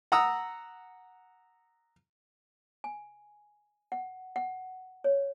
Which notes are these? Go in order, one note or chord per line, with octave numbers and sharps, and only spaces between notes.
F#5 A#5 D#6 E6
G#5
F#5
F#5
C#5